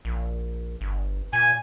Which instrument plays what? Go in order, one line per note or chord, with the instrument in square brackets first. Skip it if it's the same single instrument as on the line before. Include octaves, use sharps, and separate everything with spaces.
[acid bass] A#1
G1
[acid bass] A#2 [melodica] G#5